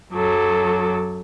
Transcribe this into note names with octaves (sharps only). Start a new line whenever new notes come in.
F#2 F#3 A4 D6